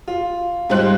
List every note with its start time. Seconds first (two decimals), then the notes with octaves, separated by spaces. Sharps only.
0.08 F4
0.70 G#2 G3 F4 C5 F#6